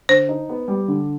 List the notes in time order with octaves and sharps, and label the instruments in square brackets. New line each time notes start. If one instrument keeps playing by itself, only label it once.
[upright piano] D3 [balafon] C5
[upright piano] D#4
B3
G3
D3